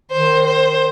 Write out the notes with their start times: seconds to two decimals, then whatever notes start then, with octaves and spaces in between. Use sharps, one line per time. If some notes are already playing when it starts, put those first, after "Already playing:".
0.11 D#3 C5
0.46 C5